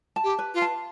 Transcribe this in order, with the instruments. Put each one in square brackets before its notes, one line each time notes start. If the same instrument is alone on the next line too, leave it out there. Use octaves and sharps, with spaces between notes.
[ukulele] A5
[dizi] G4
[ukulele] B4
[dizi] F4
[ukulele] A5